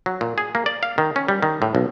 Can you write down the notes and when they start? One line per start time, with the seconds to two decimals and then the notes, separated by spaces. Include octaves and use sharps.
0.06 F#3
0.21 A#2
0.38 G#4
0.55 A#3
0.66 D5
0.83 F5
0.98 D#3
1.16 C#4
1.28 G3
1.42 D#3
1.62 A2
1.75 B1